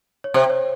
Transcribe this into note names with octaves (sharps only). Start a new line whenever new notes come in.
C#5
C3 C5
C#5